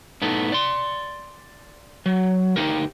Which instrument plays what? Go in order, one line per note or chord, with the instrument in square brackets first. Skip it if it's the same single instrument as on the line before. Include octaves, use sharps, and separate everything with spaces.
[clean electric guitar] A2 B3 D#4 A4
D5 C6
F#3
D2 D#4 G4 A#4